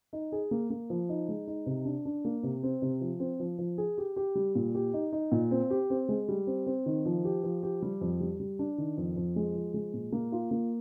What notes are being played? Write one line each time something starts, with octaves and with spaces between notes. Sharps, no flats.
D#4
G#4
A#3
A#3
F3
D#4
G#3
D#4
C3
D4
D4
A#3
C3
C4
C3
F3
C4
F3
F3
G#4
G4
G4
G3
A#2
G4
D#4
D#4
A#2
C4
G4
C4
G#3
G3
C4
C4
D#3
F3
G4
F3
G4
G3
F2
G3
G3
D4
D#3
F2
F2
G#3
F3
G#3
A#2
A#3
F4
A#3